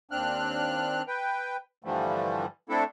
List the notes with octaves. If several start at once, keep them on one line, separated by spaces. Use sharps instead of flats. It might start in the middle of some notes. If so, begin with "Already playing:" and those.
D#2 C4 D4 F6 F#6
B4 G5
G2 D3 E3 F3 G3 A3
A3 C4 D4 E4 A4